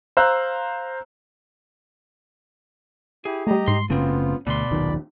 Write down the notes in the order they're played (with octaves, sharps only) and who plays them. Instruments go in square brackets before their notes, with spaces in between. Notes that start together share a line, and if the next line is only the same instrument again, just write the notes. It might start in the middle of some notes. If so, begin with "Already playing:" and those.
[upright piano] C5 F5 A#5 E6 F#6
[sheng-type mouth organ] E4 G4 [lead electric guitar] G#4
[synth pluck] G3 A3 [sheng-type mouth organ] G4 D#5 A#5
[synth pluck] G#2 C7 [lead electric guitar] C6
[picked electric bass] F#1 C#3 [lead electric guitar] A3 C4 [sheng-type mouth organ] B3 F4
[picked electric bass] D2 [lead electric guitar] B2 C6 [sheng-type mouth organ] D5 B5
[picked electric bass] D#1 B1 D#3